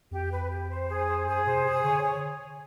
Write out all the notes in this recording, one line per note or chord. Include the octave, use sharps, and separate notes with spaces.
F2 G4
B4
G4
C5
G#4
C5
F#2 G#4
B2 C5
C3
G#4
D3 C#5
C#5